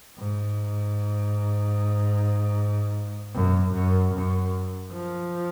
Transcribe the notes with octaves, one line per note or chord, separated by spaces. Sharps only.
G#2
F#2
F#2
F#2
F3